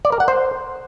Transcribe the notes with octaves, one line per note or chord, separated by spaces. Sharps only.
D5
A#4
F#5
C5